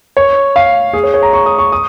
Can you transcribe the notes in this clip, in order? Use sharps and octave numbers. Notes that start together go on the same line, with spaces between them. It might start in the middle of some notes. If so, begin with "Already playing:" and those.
C#5
F5
G#4
C#5
C#5
A#5
C#6
D#6
C#6
D#6